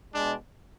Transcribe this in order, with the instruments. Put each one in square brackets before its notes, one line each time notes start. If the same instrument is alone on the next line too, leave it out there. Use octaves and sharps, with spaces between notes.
[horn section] B2 G#3 D4